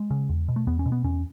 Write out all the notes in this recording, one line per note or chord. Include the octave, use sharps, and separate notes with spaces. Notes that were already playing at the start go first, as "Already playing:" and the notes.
Already playing: G#3
C#3
E2
B2
A3
E2 B3
C#4
B2
B3
E2 C#4